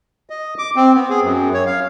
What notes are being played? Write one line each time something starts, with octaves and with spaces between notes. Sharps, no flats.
D#5
D6
C4
B3
G#4
F#2
C#5
F5